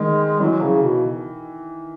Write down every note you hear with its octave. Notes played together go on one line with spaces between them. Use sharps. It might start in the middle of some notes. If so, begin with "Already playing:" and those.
Already playing: D#3 G#3
E3 F#3
C#3
B2